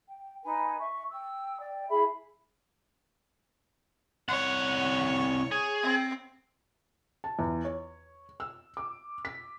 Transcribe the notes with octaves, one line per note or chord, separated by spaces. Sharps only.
G5
D#4 B4 G#5
E5 C#6
G5 E6
D5 G5
E4 G#4 E5 B5
C2 C#5 F#5
G#4
C4
A5
E2
C#5
E6
D6
B6